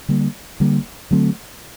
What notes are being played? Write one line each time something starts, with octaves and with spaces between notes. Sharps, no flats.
D3 G3 A#3
D3 G3 A#3
D3 F#3 A3 C4